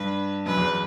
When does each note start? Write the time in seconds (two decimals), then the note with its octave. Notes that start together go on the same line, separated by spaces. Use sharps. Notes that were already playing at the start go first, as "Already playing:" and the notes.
Already playing: G2 B4
0.46 F#2 B4
0.57 E2